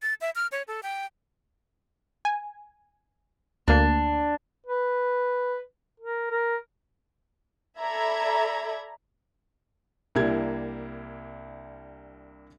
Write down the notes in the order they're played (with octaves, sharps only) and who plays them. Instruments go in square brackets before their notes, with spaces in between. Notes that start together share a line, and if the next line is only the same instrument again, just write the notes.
[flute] A6
E5
F6
C#5
A4
G5
[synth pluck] G#5
[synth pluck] D2 A#3 [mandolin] D4
[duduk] B4
A#4
A#4
[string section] A4 D5 E5 A#5 B5 G#6
[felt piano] C2 A#3 D4 E4 G4 G#6